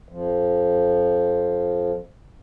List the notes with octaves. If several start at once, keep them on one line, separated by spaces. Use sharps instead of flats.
F2 F3